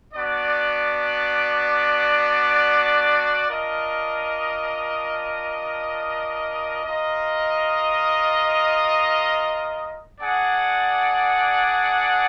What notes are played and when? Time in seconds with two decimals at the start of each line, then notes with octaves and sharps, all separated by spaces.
0.13 B3 D4 F#4 D5
3.49 D4 F4 A#4 D#5
6.85 F4 A#4 D#5
10.19 D4 G#4 D5 F#5